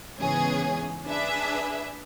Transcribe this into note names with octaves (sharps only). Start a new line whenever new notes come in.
G#2 C#3 E3 B3 C#4 G#4
D4 G#4 B4 E5